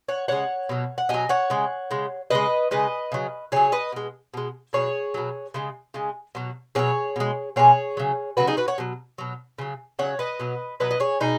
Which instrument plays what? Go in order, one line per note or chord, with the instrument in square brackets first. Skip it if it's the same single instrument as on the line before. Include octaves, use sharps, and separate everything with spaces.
[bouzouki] C#5 F#5
C#3 G#3 C#5 F#5
B2 F#3
F#5
B2 F#3 D#5 G#5
C#5 F#5
C#3 G#3
C#3 G#3
C#3 G#3 B4 D#5
C#3 G#3 B4 D#5
C#3 F#3
C#3 F#3 G#4 C#5
B4 D#5
B2 G#3
B2 G#3
B2 F#3 G#4 C#5
B2 F#3
C#3 G#3
C#3 G#3
B2 F#3
B2 F#3 G#4 C#5
B2 G#3
B2 G#3 G#4 C#5
C#3 F#3
C#3 F#3 F#4 B4
D#4 G#4
F#4 B4
C#5 F#5
B2 F#3
B2 F#3
C#3 F#3
C#3 F#3 C#5 F#5
B4 D#5
B2 F#3
B2 F#3 B4 D#5
D#5
G#4 C#5
B2 D#4 G#4